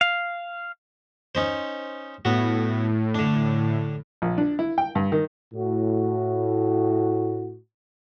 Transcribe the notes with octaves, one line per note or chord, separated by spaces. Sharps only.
F5
C#4 D#4 C5
A2 B3 F#4
D3 D4
A#1
D4
E4
G5
G2
D#3
A2 F#4